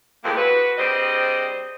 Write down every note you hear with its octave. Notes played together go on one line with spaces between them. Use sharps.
F2 A2 C3 G#3 A#3
F#4 B4
G3 C4 D4 G#4 C5 D#5